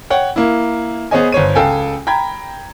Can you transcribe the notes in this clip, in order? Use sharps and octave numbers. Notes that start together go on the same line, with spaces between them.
C#5 F#5 G5
A#3 E4
B3 G#4 C5 C#5 D#5 G#5
G1 C5 C#5 D#7
C#2 A4 F5 G5 G#5
G5 A#5 B5 G#6